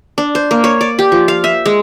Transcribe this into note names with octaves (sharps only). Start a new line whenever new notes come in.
D4
C5
A#3
C#5
D5
G4
F3
F5
E5
G#3